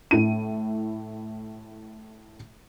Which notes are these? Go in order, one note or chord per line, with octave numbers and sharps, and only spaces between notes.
A2 E4 D#7